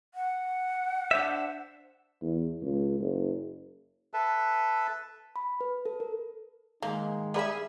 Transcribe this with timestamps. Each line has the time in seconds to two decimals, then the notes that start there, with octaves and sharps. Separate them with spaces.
0.14 F#5
1.11 D4 C5 E5
2.22 E2
2.62 C#2
3.00 F#1
4.13 A4 B4 E5 A5
5.36 B5
5.61 B4
5.86 A4
6.00 A#4
6.82 G#2 D#3 G#3 A#3 D#4
7.34 G3 G#4 B4 E5 B5